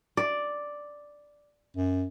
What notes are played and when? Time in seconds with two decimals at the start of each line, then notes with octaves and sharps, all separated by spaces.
0.17 D5
1.77 F#2